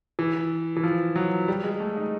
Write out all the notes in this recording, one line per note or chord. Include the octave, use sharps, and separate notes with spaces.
E3
E3
F3
F#3
G3
G#3
A3
D#4